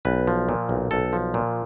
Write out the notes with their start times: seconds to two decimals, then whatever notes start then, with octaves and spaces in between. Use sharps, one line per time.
0.05 B1 B4
0.27 F3
0.49 A#2
0.69 B1
0.91 B1 A4
1.13 F3
1.34 A#2